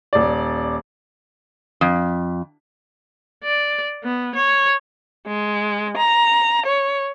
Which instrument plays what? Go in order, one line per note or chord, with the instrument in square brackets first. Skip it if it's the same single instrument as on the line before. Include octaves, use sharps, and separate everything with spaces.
[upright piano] D#1 D5
[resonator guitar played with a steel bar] F2
[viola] D5
B3
C#5
[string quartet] G#3
A#5
C#5